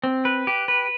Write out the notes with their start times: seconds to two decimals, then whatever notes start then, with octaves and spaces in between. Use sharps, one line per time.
0.04 C4
0.25 B4
0.47 G4
0.68 B4